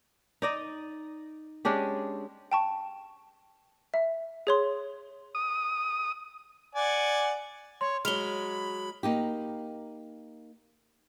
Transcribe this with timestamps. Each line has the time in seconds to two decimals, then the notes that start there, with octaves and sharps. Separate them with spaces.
0.42 D#4 D5 D#5
1.65 G#3 C#4 D4 G4
2.52 G5 A5 C#6
3.94 E5
4.47 G#4 C#5 C6
5.35 D#6
6.75 D5 F#5 G#5
7.81 C#5 C6
8.05 F#3 G#3 B5 F6 F7 G7
9.03 A#3 D#4 G4